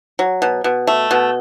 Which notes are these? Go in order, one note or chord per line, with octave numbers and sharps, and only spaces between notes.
F#3
B2
B2
A3
B2